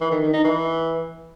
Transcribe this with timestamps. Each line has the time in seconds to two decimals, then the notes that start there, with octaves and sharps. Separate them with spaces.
0.01 E3
0.12 D#3
0.23 D#3
0.34 D#4
0.45 E3